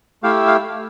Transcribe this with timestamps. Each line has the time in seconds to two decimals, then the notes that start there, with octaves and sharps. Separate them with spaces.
0.23 A3 E4 G4 F5
0.47 F5